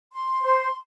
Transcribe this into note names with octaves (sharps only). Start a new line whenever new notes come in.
C6
C5